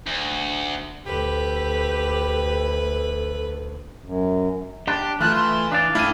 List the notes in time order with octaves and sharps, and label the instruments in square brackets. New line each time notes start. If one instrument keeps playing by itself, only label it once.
[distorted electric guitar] D2
[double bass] D2 [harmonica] G4 [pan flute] A4 [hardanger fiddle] B4
[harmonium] F#2
[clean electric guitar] D4 [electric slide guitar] G4
[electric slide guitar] E3 E4 [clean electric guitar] A3 F4 [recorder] F#6
[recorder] C6
[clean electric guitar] D4 D5 [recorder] F5
[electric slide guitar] A3 C#4 G5 [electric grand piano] E4 F6 D#7